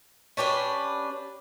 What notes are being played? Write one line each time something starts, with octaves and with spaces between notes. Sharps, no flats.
C#4 D4 G4 B4